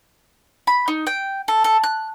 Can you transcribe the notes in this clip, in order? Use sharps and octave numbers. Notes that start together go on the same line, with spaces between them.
B5
D#4
G5
A4
A4
F#6